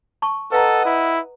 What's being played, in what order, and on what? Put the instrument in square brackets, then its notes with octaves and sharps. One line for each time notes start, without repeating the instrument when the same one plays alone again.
[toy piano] A5 C#6
[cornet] A4 [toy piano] B4 F5 A#5 [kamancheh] D#5 F#5
[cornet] E4